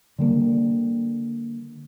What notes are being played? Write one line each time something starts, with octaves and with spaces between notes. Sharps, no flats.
D3 G3 A#3